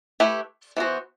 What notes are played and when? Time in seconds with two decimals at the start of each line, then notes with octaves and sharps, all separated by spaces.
0.20 A3 E4 G4 B4
0.77 E3 B3 F#4 C5